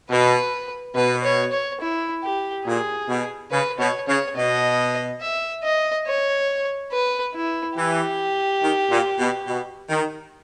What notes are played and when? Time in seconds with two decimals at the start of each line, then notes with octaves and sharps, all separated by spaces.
0.10 B2 B4
0.95 B2 B4
1.24 C#5
1.53 C#5
1.81 E4
2.23 G4
2.65 A#2 G#4
3.08 B2
3.51 C#3 B4
3.79 B2 C#5
4.08 C#3 C#5
4.36 B2 D#5
5.21 E5
5.64 D#5
6.07 C#5
6.92 B4
7.34 E4
7.77 E3 G4
8.62 D#3
8.90 A#2
9.19 B2
9.47 B2
9.90 D#3